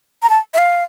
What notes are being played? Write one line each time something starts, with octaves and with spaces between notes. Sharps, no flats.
A#5
A5
E5
F5